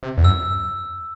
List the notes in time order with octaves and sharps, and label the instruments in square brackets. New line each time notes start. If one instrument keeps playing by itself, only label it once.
[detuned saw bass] C3
E2
[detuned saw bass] F#2 [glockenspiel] E6